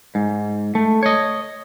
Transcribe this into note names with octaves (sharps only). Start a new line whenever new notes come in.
G#2
A3
C#5 D#5